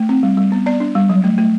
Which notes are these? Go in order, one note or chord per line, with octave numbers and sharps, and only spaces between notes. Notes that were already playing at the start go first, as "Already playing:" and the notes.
Already playing: A3
C4
G3
G3
B3
B3 D5
D4
G3
F#3
A3
A3